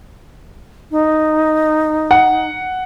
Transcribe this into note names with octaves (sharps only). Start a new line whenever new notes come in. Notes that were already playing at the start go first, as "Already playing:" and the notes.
D#4
F#5